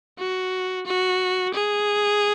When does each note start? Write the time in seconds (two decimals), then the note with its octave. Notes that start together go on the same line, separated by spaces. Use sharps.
0.18 F#4
0.86 F#4
1.54 G#4